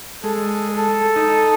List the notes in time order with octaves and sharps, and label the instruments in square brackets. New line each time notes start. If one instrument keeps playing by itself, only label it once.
[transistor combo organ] G#3 [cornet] A4
[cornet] A4
[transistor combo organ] D#4